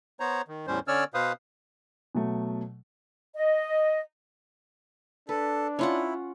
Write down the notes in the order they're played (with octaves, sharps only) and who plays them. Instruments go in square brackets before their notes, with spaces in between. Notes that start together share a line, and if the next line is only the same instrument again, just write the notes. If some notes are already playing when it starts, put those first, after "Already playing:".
[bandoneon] B3 C5 C#5 A#5
D#3
E2 A2 G3 C#4 C5
D3 C#4 C#5 D5 E6 F6
B2 B4 C5 F5 D#6
[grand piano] B2 F#3 A3
[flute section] D#5
[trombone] D4 [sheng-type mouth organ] A4 [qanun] B4
[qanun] C#4 F4 F#5 [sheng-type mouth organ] E4